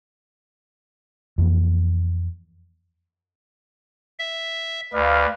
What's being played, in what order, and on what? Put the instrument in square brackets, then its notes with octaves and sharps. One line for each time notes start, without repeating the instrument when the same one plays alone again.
[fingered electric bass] F2 E3 A#3
[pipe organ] E5
[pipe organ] D2 [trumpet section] B4 D5 F5